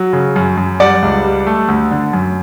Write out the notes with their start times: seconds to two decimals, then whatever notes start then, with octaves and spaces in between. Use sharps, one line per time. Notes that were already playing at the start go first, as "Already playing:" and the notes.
Already playing: F#3
0.13 C#3
0.36 F#2
0.57 F#2
0.80 G3 D5 F#5
1.02 C#2
1.24 G3
1.47 A3
1.68 D2
1.91 D3
2.13 F#2